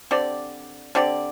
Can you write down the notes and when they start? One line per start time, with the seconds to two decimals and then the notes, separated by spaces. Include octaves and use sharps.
0.11 D3 C4 G4 D5
0.95 D3 C4 G4 D5